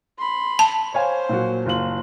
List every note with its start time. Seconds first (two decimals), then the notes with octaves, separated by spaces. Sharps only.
0.18 B5 C6
0.59 A5 G7
0.94 C5 C#5 F5 G#5
1.29 A#2 F#3 F#4
1.66 F#1 F4 F#7